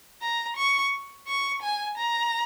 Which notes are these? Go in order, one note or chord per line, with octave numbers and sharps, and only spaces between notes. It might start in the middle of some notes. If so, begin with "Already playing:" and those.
A#5
C#6
C#6
G#5
A#5